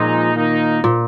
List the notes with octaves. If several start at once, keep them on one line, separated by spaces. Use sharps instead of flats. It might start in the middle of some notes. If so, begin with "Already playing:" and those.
Already playing: A#2 F3 G#3 D#4
D#3 A#3 D#4
A#2